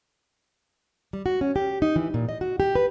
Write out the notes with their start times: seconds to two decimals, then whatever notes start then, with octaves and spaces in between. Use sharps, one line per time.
1.13 G3
1.26 F#4
1.41 C#4
1.56 G4
1.82 D#4
1.96 E3
2.14 A#2
2.29 D#5
2.41 F#4
2.60 G4
2.75 B4